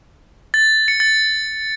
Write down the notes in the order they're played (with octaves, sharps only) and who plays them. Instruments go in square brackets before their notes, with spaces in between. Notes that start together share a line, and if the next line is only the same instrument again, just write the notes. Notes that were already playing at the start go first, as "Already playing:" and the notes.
[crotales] A6
C#7
A6